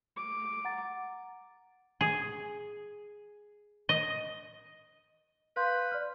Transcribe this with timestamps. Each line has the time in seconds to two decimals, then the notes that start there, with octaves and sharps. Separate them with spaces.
0.17 D6
0.65 F#5 A#5 A6
2.01 G#4
3.89 D#5
5.57 B4 F5 C6 G6
5.92 D5 F6